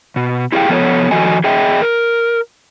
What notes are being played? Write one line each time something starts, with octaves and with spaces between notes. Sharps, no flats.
B2
E4 G4 G#4 D#5 F5 G5
F3 B3 A4 C5 C#5
D#3 F3 F#4 A4 D#5 G#5
G#4 D#5 E5 G5
A#4